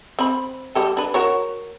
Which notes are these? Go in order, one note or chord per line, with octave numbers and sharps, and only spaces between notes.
C4 B5
G3 G4 A4
D4 B4
F#4 A#4 C#5